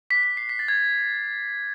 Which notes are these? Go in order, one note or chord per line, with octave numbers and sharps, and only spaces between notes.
D6 F#6 B6
B6
C7
B6
A6
G#6